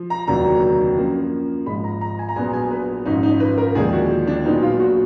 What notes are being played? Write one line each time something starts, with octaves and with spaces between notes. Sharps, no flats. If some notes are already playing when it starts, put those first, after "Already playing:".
Already playing: F3
A#5
F1 D#2 D3 F#3 A#5
F#2 F3 A#3
G#1 G#2 F3 G#3 B5
A#5
A#5
G#5
A#5
A#1 A#2 F#3 B3 G#5
G#5
B4
G#1 F#2 F3 D#4
D#4
B4
A#4
D#2 D3 F3 G#3 G#4
F#4
D4
A#1 A#2 F#3 B3 D#4
F4
F#4